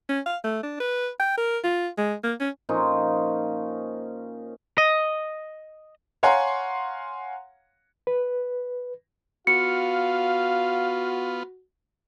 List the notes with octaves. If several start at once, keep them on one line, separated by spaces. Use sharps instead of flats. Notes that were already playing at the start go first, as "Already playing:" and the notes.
C#4
F5
A3
D4
B4
G5
A#4
F4
G#3
A#3
C#4
A#2 F3 C#4 D#4
D#5
C#5 F5 F#5 G#5 A#5 C6
B4
B3 F4 F#4 F5 C#7